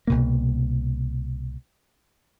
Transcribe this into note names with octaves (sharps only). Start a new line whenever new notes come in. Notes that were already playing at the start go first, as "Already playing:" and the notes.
C2 B2 A#3